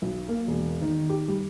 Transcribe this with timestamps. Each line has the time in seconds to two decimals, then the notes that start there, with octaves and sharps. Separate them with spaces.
0.02 B1
0.28 A#3
0.48 E1
0.82 D#3
1.09 G4
1.28 G3